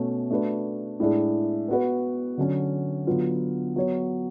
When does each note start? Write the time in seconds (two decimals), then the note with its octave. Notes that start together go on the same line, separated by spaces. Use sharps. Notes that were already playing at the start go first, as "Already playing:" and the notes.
Already playing: B2 A3 C#4
0.31 A3 D4 F#4 B4
1.00 A2 G#3 D4 G#4
1.68 B3 F#4 B4
2.38 D3 F#3 C#4
3.07 D3 F#3 B3 F4
3.76 F#3 B3 F#4 C#5